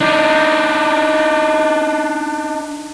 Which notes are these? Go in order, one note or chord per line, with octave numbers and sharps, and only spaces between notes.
D4 D#4